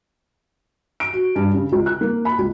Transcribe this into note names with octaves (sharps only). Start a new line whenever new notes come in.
D7
F#4
G2
C#3
C#2
F#6
A#3
B5
C#2